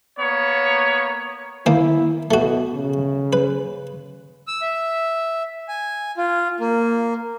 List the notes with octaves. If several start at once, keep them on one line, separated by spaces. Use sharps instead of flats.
A#3 B3 C#5
D#3 A#3 E4
B2 A3 F#4
C#3
B4
E6
E5
G#5
F4
A#3